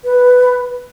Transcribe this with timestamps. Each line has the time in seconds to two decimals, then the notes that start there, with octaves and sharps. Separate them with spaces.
0.05 B4